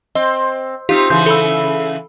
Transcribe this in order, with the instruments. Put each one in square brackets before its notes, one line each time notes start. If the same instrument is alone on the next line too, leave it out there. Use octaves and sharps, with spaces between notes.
[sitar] C4 [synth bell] D#5
[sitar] C4 D#4 F4 [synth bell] G4
[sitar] C#3 E3 [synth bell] G6
[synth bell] A4 B5 E6